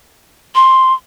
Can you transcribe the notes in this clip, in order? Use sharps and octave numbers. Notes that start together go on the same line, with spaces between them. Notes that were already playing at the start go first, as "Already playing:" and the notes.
C6